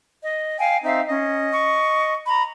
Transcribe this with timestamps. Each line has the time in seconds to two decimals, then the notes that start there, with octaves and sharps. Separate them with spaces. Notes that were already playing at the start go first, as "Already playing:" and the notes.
0.22 D#5
0.60 F5 G5 G#5
0.84 C4 D#4 E5 F5
1.08 C#4 D#5
1.51 C#6
2.26 A#5 B5